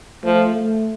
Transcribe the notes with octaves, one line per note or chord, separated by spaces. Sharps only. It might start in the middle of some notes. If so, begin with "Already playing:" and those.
F3 A3
A3